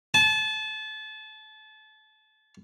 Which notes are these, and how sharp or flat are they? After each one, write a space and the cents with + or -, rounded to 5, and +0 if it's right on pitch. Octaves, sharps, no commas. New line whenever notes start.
A5 -30